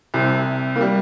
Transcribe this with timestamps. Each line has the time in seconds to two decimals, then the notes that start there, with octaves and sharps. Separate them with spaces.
0.14 C2 C3
0.76 A#3
0.81 G3